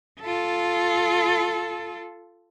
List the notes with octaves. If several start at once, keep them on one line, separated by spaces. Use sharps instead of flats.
F4 A4